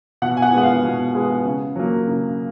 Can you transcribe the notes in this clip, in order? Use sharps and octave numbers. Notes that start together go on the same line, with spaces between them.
B2 F#5
G#5
F#5
G#3 B3 F#5
F5
B2
G#3 B3
C#3
F#3 A#3
C#3